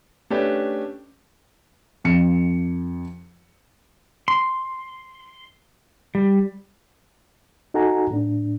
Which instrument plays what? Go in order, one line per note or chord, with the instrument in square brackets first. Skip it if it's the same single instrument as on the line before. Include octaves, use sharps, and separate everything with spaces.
[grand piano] A3 C#4 D4 G4 B4
[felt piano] F2 C#7
[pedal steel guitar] C6
G3
[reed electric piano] D#4 F#4 A4 F#5 G#5 A#5
A2 D4